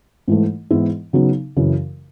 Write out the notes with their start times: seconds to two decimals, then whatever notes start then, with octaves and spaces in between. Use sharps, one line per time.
0.28 G#2 E3 A3
0.71 G#2 E3 G#3 B3 E4
1.13 C#3 F#3 B3 D#4
1.56 F#2 C#3 E3